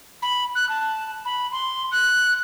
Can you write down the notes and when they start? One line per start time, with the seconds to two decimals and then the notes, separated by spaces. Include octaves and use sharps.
0.22 B5
0.55 F#6
0.69 A5
1.25 B5
1.52 C6
1.92 F#6